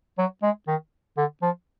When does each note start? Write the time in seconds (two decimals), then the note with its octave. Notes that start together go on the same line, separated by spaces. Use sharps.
0.18 F#3
0.43 G#3
0.68 D#3
1.17 D3
1.42 F3